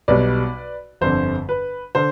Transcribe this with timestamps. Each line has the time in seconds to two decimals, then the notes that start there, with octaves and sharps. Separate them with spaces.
0.08 B1 B2 G3 B4 D5
1.01 G1 F2 D3 C5
1.49 B4
1.95 D3 C5